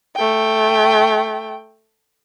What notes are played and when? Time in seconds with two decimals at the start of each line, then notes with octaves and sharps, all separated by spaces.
0.16 A3 G5